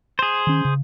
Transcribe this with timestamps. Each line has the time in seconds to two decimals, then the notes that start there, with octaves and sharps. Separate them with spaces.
0.19 G#4 C5
0.47 D#3 C#4
0.65 C#3